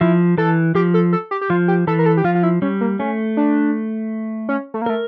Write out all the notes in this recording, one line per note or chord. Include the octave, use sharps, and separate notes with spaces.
F3 E4
E3 A4
F3 G4
A4
A4
G4
G4
F3 F4
G4
E3 A4
A#4
A4
G4
F3 F4
F4
E4
G3 C#4
A#3
A3 C#4
D4
C#4
A3
A#3
A3 A#4